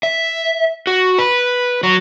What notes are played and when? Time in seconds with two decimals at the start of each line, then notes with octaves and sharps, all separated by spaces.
0.03 E5
0.87 F#4
1.19 B4
1.83 F#3